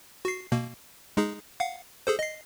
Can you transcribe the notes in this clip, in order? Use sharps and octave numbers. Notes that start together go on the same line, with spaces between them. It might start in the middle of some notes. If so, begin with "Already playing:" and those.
F#4 C7
B2 A#3
G#3 D#4 G#4
F5 F#5
G#4 A4 C5
D#5 C7